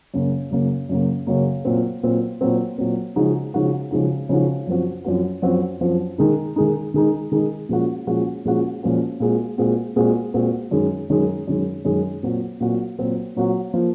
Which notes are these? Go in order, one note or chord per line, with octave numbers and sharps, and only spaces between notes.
F#2 C#3 F#3 A#3
F#2 C#3 F#3 A#3
F#2 C#3 F#3 A#3
F#2 C#3 F#3 A#3
A#2 F#3 C4
A#2 F#3 C4
A#2 F#3 C4
A#2 F#3 C4
C#3 F3 G#3 D#4 F#4
C#3 F3 G#3 D#4 F#4
C#3 F3 G#3 D#4 F#4
C#3 F3 G#3 D#4 F#4
F#2 F3 C4 F#4
F#2 F3 C4 F#4
F#2 F3 C4 F#4
F#2 F3 C4 F#4
D#3 G#3 D#4
D#3 G#3 D#4
D#3 G#3 D#4
D#3 G#3 D#4
A#2 F3 G#3 C#4 F#4
A#2 F3 G#3 C#4 F#4
A#2 F3 G#3 C#4 F#4
A#2 F3 G#3 C#4 F#4
A#2 G#3 C4 F#4
A#2 G#3 C4 F#4
A#2 G#3 C4 F#4
A#2 G#3 C4 F#4
F#2 D#3 G#3
F#2 D#3 G#3
F#2 D#3 G#3
F#2 D#3 G#3
A#2 F#3 C4 F#4
A#2 F#3 C4 F#4
A#2 F#3 C4 F#4
A#2 F#3 C4 F#4
F3 A#3